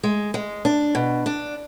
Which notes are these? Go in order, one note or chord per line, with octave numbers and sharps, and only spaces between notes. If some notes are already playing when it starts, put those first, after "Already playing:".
G#3
G#3
D4
B2
D4